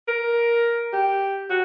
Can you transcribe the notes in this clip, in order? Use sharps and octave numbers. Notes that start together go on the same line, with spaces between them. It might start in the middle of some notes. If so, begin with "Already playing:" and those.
A#4
G4
F#4